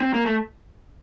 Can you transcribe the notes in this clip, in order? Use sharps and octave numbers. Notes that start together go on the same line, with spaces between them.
C4
A#3
A3